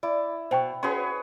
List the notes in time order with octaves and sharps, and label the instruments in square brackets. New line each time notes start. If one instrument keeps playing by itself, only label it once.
[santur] E4 [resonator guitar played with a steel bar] D5
[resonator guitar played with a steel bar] B2 [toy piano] C5 G5 C#6
[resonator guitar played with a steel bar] C#4 F#4 [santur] G#4 B4 C#5 [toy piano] C6